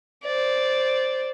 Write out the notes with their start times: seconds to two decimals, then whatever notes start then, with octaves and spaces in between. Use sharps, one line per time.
0.24 C5 D5